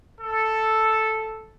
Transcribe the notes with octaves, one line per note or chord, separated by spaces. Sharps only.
A4